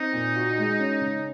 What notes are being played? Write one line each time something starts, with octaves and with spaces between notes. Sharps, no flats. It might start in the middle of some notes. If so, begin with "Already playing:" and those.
Already playing: C4 D#4
A#2
F#4
G#3
C#4
C#3